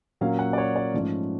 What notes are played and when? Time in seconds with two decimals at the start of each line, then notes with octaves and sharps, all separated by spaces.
0.21 A#2 F#3 A#3 C#4 F5
0.39 F#5
0.53 D5
0.58 C#5
0.76 D5
0.94 G#2 F3 A3 C#4